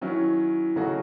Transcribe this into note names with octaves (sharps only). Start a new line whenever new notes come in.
D#3 F#3 C#4 E4
C#3 F#3 A3 D#4 F#4